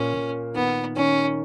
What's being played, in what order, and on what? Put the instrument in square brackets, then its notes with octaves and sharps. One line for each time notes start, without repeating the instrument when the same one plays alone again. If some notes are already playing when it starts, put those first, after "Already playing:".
Already playing: [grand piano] A#2 A#3 [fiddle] C#4
[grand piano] A#2
[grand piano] D#3 [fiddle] B3
[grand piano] D#3 [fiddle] C#4